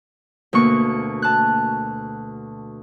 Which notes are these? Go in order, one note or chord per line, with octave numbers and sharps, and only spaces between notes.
D2 B2 A#3 C#6
A5 F#6